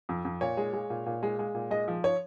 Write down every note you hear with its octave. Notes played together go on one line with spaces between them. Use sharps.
F2
F2
A#2 C#5
G#3
G#3
A#2
A#2
G#3
G#3
A#2
G#3 D#5
F3
C#5